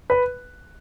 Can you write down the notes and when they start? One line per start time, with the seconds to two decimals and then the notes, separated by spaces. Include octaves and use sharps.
0.10 B4